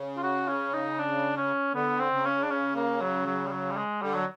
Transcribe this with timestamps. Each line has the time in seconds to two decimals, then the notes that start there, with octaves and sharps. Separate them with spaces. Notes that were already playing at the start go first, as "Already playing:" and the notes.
Already playing: C#3
0.17 F4
0.23 F#4
0.48 C#4
0.74 D#4
0.99 D4
1.37 C#4
1.74 D3 B3
2.00 C4
2.13 C#3
2.25 C#4
2.43 D4
2.51 C#4
2.76 A#3
3.01 F#3
3.27 F#3
3.47 G3
3.51 F#3
3.71 G3
3.77 G#3
4.02 D3 G3
4.14 F#3